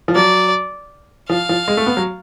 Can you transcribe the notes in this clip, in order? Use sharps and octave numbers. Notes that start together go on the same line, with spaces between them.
F3
F#3 D5
F3 F5
F3
G#3
A3
B3
F#3